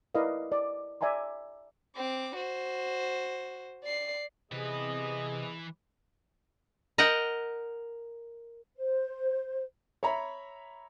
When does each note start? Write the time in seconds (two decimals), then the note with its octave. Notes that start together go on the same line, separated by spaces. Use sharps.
0.15 E4 A#4 B4 D5 D#5 F5
0.52 D5
1.01 D5 E5 G#5 A#5 C6
1.96 C4 D6
2.36 F#4 C5
3.83 D5 C7
4.51 C3 E3 B3 G#4 B4 D#5
6.98 A#4 D#5 F#5 G5
8.77 C5
10.03 C#5 E5 A#5 B5